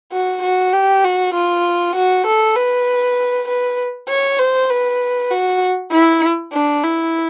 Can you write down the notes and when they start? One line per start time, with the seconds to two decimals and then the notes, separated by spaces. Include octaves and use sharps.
0.13 F#4
0.43 F#4
0.73 G4
1.04 F#4
1.35 F4
1.96 F#4
2.27 A4
2.57 B4
3.48 B4
4.09 C#5
4.39 C5
4.70 B4
5.31 F#4
5.92 E4
6.53 D4
6.83 E4